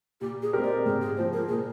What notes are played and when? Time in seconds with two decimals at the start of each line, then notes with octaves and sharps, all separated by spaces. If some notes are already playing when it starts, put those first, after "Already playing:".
0.21 A#2 G4
0.42 G#4
0.53 G#3 C4 G4 A#4
0.64 D5
0.85 G#2 G#4
1.01 G#4
1.16 F3 A#3 C5
1.33 A#4
1.48 A#2 G#4